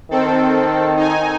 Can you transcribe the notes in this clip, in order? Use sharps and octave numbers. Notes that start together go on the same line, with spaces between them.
D#3 C4 A4
D#4 G#5